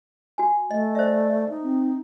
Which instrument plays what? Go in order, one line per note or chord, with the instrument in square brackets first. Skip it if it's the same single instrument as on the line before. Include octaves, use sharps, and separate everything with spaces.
[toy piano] F#4 G#5
[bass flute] A3 [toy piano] D#5
[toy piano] C5 E5 [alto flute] D5
[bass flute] D#4
[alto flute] C4